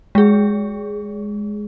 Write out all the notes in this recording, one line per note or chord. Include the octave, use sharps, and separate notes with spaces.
G#3 G#4